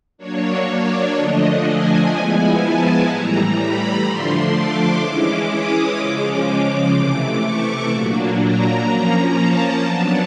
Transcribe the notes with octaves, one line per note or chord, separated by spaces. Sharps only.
F#3 A#3 D4 C#5
D5
D3 F3 A3 D4 D#5
G#5
F3 G#3 B3 E4
A5
A2 E3 G3 A#5
B5
D3 F3 A3 D4 C6
D6
E3 G#3 C#4 E4
D#6
C#3 F3 G#3 C#4 D6
D6
C3 E3 A3 D6
C#6
A#2 F#3 A#3 D4
A#5
F3 A#3 C#4 A#5
A5
F#3 B3 D4